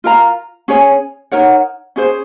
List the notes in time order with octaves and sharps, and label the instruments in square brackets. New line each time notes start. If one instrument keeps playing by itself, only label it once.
[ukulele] F4 A#4 F5 A#5
C#4 G#4 C#5 G#5
D#4 A#4 C#5 F#5
C#4 G#4 C5